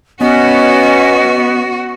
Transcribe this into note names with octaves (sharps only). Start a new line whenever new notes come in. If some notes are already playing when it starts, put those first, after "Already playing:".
B3 C#4 F#4 D#5